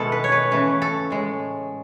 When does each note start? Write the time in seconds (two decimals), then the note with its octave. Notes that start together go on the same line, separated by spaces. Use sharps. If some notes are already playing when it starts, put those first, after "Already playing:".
Already playing: B2 D#3 G#3 B3 E4 A4
0.12 B4
0.24 C#5
0.32 B4
0.51 C#3 E3 A3 B4
0.82 A4
1.10 A2 G#3